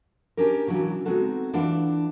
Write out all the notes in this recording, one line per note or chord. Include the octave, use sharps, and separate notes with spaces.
C#4 D4 G4 A#4
C#3 E3 F#3 D4 F#4
G#3 B3 C4 D#4 F#4 A4
E3 D4 F4 F#5